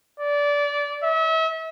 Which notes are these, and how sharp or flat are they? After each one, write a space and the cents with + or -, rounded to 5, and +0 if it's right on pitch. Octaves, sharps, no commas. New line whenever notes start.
D5 -20
E5 -35